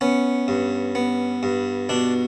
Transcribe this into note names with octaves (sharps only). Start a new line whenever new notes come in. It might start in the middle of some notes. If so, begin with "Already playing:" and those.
B3 C#4
G2
B3
G2
B2 D4